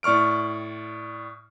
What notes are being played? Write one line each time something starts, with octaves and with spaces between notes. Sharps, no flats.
A2 D5 C#6 F6 D7